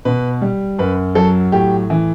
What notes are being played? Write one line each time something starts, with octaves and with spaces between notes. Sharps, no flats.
B2 B4
G3
F#2 B4
F#3 A4
A2 G4
E3